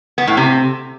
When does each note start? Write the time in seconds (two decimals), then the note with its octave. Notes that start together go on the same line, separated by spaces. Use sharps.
0.18 B3
0.27 A2
0.37 C3